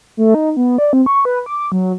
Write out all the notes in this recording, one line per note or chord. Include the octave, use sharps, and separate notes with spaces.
A3
D#4
B3
D5
C4
C#6
B4
D6
F#3